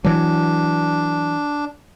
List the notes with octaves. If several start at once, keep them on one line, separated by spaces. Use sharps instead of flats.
E3 F#3 D4